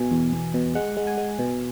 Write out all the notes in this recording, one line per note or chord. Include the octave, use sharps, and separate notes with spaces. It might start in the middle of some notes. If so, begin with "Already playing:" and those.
Already playing: B2 G#5
E2
E2
B2
G#3 F#5
G#3
G#5
G#3
B2